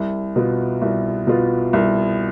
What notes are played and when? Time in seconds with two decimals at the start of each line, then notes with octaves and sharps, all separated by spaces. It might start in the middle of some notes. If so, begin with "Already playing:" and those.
Already playing: C2
0.36 B2 B3 F4
0.82 C2
1.27 B2 B3 F4
1.73 C2